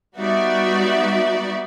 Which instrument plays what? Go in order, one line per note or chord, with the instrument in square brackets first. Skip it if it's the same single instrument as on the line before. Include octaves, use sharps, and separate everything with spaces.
[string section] G3 B3 D#4 F#4 D5 E5